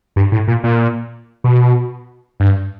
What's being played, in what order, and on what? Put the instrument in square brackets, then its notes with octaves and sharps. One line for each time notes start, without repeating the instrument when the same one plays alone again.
[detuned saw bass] G2
A2
A#2
A#2
B2
G2